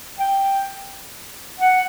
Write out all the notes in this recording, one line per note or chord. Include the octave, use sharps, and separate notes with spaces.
G5
F#5